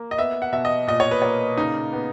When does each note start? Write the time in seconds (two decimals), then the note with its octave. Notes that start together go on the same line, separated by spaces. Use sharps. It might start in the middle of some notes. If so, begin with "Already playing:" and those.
Already playing: A#3
0.11 D#5
0.18 B3 E5
0.42 F#5
0.52 B2 E5
0.65 D#5
0.87 A#2 D#5
1.00 C#5
1.11 B4
1.22 A#3 C#5
1.57 C#3 D#4
1.93 B3